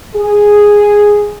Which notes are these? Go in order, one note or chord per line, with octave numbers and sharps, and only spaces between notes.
G#4